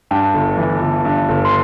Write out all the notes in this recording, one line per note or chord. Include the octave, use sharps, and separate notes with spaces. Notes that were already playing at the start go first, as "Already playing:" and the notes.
G2 G5
G1
E3
G1
G2
G1
C6